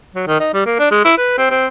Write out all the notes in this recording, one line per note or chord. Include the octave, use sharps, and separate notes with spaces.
F#3
D#3
D#4
G3
A#3
D4
G#3
E4
B4
C4
C4